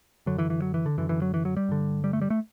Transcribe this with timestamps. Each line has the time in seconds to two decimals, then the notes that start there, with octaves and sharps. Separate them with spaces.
0.26 F#2 D3 F#3
0.38 E3
0.50 E3
0.62 F#3
0.74 E3
0.86 D3
0.98 F#2 D3 E3
1.09 E3
1.22 F#3
1.34 E3
1.45 F#3
1.57 G3
1.69 G2 D3
2.04 G3
2.13 A3
2.22 G3
2.30 A3